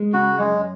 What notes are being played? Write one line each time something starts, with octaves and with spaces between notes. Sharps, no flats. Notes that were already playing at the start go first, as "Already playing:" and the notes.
Already playing: G#3
C#3 F#4
F#2 G#3